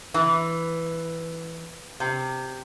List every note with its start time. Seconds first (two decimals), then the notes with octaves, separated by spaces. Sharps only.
0.14 E3
2.00 C3